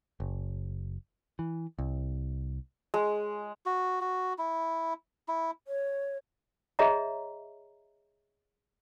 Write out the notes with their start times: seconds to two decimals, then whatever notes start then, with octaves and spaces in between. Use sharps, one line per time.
0.20 F#1
1.39 E3
1.78 C2
2.94 G#3
3.66 F#4
4.01 F#4
4.38 E4
5.28 E4
5.68 C#5
6.79 G#4 C#5 D#5 E5 A#5